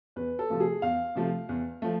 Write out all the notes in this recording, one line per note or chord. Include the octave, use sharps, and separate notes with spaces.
E2 B4
A4
C3 F3 A3
G#4
E2 F5
C3 F3 A3
E2
F3 A3